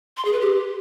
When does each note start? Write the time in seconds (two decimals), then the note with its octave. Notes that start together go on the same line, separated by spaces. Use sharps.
0.17 C6
0.25 G#4
0.33 B4
0.41 G4